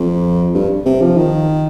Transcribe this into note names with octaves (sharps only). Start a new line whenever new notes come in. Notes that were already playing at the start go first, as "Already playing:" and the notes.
Already playing: F2
G2
C3
F3
D#3